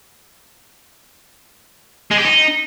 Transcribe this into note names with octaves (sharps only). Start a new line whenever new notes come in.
G#3
G4
D#4